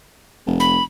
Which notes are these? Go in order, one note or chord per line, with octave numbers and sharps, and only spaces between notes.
F1
B5